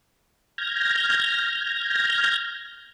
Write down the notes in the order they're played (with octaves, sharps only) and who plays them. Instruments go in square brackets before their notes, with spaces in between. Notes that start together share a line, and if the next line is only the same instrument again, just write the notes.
[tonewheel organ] F6 G6 G#6 A#6